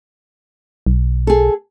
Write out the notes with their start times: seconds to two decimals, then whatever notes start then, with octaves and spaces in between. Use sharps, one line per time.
0.87 B1
1.27 G#4 A4